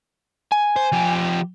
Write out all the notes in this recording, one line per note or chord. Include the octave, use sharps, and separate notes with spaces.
G#5
C5
F3 G4